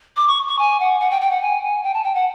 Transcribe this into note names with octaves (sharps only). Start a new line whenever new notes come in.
D6
C#6
C#6
G#5
F#5
F#5
G5
G5
F#5
G#5
G#5
G5
A5
G5
F#5